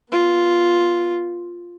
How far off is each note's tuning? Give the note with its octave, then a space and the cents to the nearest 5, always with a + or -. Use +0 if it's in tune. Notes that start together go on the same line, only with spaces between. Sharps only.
B3 -20 F4 +0